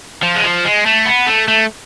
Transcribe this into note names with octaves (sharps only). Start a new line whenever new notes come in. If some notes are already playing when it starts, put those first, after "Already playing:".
F3
G#3
F3
G#3
A3
B3
A3
A3